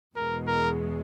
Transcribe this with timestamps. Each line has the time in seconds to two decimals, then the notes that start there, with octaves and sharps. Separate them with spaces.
0.16 E2 B2 G#3 A#4
0.47 A#4